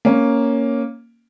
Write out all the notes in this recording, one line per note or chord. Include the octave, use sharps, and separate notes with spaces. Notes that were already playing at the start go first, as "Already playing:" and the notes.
A#3 C#4